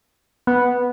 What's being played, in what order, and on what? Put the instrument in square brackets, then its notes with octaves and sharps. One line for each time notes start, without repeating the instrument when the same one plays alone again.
[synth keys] B3